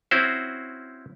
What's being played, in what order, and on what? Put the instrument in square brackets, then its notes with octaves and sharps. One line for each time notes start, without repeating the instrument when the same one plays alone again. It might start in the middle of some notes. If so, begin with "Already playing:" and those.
[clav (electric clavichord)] C4 C#4 E4 F#4 C5